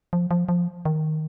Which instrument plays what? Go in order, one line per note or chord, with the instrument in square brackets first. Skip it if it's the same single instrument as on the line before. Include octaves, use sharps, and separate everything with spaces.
[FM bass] F3
F3
F3
D#3